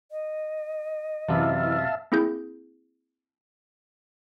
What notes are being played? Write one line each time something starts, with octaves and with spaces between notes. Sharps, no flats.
D#5
F#2 C3 E3 B4 E5 F5 A5
A#3 C4 E4 G#4 G6